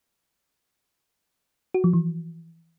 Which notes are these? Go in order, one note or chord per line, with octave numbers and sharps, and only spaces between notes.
F#4
F3
E3